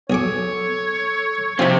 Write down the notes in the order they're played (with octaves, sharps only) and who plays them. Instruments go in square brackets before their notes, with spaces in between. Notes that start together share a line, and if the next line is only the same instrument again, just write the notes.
[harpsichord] B1 G#4 D6 [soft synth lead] A4 [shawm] C#5
[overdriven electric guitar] C3 C4 [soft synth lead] F3 [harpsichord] D#4 F4